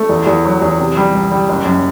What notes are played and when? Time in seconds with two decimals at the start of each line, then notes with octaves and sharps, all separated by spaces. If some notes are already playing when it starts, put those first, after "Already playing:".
Already playing: A3
0.09 E2
0.27 E2
0.45 F#3
0.62 E2
0.79 C3
0.97 G3
1.15 C2
1.32 G3
1.49 F#1
1.65 F#2